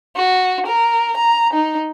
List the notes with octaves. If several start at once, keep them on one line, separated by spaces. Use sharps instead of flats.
F#4
A#4
A#5
D#4